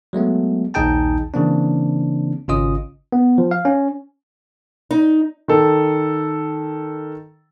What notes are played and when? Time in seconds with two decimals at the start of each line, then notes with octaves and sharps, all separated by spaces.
0.13 F#3 G#3 A3 B3
0.74 A#1 D#2 D#4 G#4 G5 A5
1.34 C#3 E3 A#3 C4 D4
2.48 G#1 C#3 C#4 F4 D#5 D#6
3.12 B3
3.38 F3
3.51 F5
3.65 C#4
4.91 D#4
5.48 D#3 A4